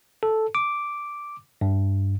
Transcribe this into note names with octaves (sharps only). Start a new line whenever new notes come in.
A4
D6
G2